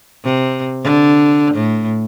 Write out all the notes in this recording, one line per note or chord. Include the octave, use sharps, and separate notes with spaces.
C3
D3
A2